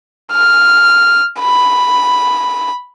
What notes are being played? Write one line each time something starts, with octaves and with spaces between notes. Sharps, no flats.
F6
B5